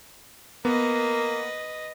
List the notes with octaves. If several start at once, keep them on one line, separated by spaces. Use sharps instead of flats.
A#3 B3 B4 D#5